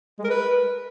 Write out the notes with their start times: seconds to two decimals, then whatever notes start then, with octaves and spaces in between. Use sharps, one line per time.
0.19 G#3
0.24 A#4
0.30 B4